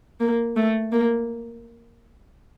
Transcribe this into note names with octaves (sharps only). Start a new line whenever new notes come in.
A#3
A3
A#3